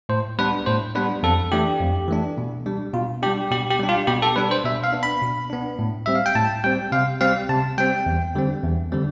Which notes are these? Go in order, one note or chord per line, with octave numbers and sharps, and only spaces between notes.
A2 C5
G3 B3 D4 B4
A2 C5
G3 B3 D4 B4
F2 A4
E3 A3 D4 G4
F2
E3 A3 D4
B2
G3 D4
B2 F4
G3 D4 G4
B2 G4
G4
G3 D4
F4
B2 G4
A4
G3 D4 B4
C5
B2 E5
F5
B3 D4
B5
B2
B3 D4
A2
G3 C4 E5
F5
G5
A2 A5
G3 C4 G5
C3 F5
G3 C4 F5
C3 A5
G3 C4 G5
E2
D3 G3 C4
E2
D3 G3 C4